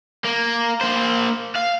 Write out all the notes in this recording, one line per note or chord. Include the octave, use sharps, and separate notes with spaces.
A#3
A#3 C5
F5